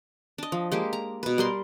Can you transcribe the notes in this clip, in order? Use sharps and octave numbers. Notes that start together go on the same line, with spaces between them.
D4 D#5
F3
G#3 A#3 G4
A#5
B2 B4
G3 A#4 C6